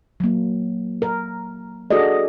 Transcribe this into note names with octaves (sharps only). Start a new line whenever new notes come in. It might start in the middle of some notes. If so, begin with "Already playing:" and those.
F#3 A#3
A#4
D4 F#4 G#4 A4 D5 D#5